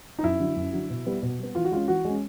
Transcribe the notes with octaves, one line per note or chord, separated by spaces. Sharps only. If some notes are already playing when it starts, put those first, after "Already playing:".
D#4
F#2 E4
D3 F#3
F#2
D3 F#3
B2
G3 B3
B2
G3 B3
E3 F4
F#4
G#3 C#4 F4
E3 F#4
G#3 C#4